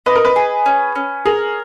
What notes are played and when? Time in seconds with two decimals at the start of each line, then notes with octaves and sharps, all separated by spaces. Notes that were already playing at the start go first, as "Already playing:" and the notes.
0.06 B4 D#5
0.16 A#4
0.25 B4
0.36 G#4
0.66 C#4
0.95 C#4
1.25 G#4 A#4